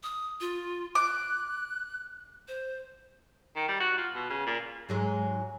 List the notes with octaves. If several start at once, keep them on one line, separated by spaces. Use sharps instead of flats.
D#6
F4
D6 F#6
C5
D#3
G3
F#4
F4
B2
C#3
A#2
G#2 F#3 G#3